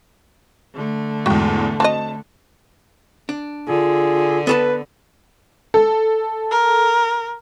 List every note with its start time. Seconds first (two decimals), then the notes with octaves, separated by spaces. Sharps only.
0.75 D3 A3
1.26 E2 G#2 F#4 G5
1.80 C4 F#4 D#5 A5
3.29 D4
3.68 D3 F4 G#4
4.47 B3 A4 B4 A5
5.74 A4
6.51 A#4